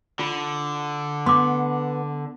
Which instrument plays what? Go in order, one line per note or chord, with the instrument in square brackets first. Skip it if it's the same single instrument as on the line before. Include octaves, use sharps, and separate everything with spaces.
[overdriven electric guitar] D3 [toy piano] F4
[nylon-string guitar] B3 [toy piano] C6 D6